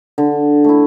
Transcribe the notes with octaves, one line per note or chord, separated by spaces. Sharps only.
D3
A3 E4